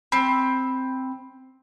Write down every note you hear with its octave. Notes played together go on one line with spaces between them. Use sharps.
C4 B5